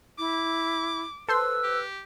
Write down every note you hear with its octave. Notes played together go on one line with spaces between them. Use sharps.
E4 D6
A4 B4 C5 C6 E6
G4